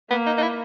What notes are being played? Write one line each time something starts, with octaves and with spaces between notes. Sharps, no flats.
A#3 B3
D#4
D#4
E4